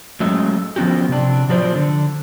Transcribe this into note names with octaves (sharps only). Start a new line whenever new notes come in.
F#3 G#3 A3 C#4
F3 B3 C#4 F#4 G4
C3 D4
B2 F3 F#3 B4 C5 D5
D3